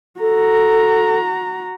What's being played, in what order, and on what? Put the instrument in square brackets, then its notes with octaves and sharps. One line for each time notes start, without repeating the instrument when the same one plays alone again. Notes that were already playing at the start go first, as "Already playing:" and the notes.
[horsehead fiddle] F#4 A#5 [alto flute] A4